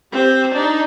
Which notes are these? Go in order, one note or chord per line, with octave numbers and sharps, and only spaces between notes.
C4 G4
D4 D#4